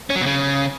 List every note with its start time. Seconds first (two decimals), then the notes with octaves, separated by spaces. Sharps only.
0.10 C#4
0.15 F#3
0.21 B2
0.26 C#3